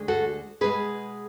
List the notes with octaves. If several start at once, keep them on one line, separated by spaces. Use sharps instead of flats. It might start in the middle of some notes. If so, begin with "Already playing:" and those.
Already playing: D2 D3 G#3
F#4 A4
B2 G#3 G#4 B4